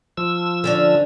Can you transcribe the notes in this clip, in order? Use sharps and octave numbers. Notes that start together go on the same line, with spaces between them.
F3 E6
D3 C#4 D4